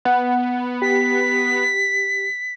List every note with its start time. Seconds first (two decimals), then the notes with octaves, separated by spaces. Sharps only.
0.05 B3 F#5
0.82 G4 B6